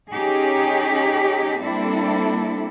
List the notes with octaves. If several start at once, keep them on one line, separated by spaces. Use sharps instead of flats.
C#4 D#4 G4 G#4
G3 A#3 C4 D4 E4 A4